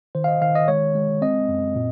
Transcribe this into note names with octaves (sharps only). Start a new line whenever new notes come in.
D#3 C5
F5
D#5
D#3 F5
D#5
G#3 C#5
G#3
C4 D#5
F#2
A#2